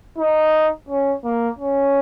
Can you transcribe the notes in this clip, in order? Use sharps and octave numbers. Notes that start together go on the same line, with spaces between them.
D#4
C#4
A#3
C#4